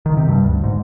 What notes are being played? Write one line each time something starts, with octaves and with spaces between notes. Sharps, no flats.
D#3
C3
G2
D2
G#2